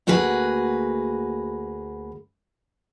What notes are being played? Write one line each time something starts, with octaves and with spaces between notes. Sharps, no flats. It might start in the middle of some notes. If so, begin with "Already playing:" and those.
D2 A#3 F#4 G#4 B4